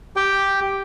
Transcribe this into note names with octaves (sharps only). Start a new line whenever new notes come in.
G4 G5